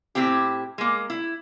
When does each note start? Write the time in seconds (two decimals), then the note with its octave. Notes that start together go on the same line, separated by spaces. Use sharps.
0.15 A2 C4 E4 G4
0.78 G#3 A#3
1.10 E4